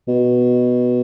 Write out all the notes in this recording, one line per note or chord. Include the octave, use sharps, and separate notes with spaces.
B2